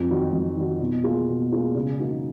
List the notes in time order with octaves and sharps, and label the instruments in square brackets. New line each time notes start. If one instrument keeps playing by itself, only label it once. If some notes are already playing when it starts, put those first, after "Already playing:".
Already playing: [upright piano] F2
D#3 F#3
F2
D#3 F#3
B2
A#3 F4 G#4
B2
A#3 F4 G#4
C#3
F#3 A#3 D#4